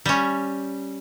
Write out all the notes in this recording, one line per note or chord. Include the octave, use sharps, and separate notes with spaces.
G3 C#4